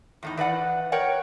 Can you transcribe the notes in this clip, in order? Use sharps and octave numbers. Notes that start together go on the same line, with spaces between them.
E2 A2 D#4
E3 B4 D5 F#5
A#4 C#5 D5 F#5 G5